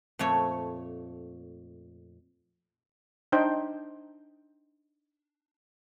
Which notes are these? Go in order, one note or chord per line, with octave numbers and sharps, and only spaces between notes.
F2 A#2 A3 C#5
D4 D#4 C5 G5